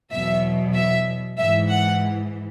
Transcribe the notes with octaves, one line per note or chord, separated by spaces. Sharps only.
E2 B2 F#3 E5
E5
G#2 E3 E5
F#5